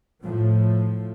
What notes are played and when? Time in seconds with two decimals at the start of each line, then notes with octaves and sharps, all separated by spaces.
0.23 A2 F3